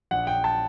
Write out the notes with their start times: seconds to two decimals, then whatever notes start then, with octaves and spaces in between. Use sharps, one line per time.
0.11 A#1 F#5
0.27 G5
0.44 A5